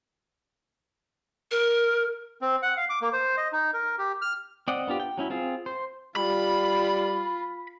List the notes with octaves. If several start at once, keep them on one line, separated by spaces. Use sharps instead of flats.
A#4
C4
F#5
F5
D6
A#3
C5
D#5
D#4
A#4
G4
F6
C4 D5 D#5 F#5
B3 D4 F4 G4
G5
F#3 C#4 E4
C4 F4 G#4
C5
G3 F4 B5